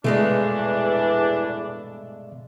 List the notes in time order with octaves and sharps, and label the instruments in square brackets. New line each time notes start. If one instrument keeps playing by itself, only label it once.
[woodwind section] E2 E3 D4 [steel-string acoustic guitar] G2 G#3 A3 [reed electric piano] B2 B3